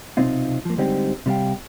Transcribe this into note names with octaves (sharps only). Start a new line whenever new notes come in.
B1 C3 C4 D#4 F4
F3 A#3
D3 G3 G#3 C4 D#4 G4
C3 G3 F#4 F5 G5